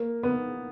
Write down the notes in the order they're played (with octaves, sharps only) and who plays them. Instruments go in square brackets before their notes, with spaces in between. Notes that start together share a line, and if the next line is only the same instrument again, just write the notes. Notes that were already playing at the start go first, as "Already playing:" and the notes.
Already playing: [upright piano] A#3
B3